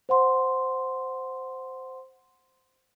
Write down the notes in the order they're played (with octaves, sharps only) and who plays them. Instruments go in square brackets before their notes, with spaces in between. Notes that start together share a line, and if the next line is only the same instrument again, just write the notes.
[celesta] C5 F#5 C6